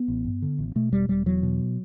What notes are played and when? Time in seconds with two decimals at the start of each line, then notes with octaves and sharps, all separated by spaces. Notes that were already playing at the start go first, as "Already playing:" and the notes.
Already playing: B3
0.08 A1
0.25 G2
0.42 D3
0.59 A1
0.76 B2 A3
0.92 E1 G3
1.09 E1 G3
1.26 E2 F#3
1.43 B2